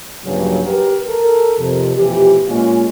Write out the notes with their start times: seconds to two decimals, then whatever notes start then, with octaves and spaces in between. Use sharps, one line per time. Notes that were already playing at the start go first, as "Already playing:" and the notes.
0.25 A#1 G2 C#3 F#3
0.64 G4 A#4 B4
1.08 A4 A#4
1.58 F2 C3
1.96 A1 B2 E3 F3 G4
2.48 A#2 G#3 C#4 F4